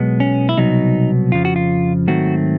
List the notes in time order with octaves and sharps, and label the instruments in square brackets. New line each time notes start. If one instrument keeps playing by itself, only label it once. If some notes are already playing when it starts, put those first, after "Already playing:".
Already playing: [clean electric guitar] B1 B2 G#3 B3
C#4
E4
C2 B2 F#3 B3 D#4
F2 C#3 F3 F4
F#4
F4
G#2 D#3 F#3 A3 C4 F#4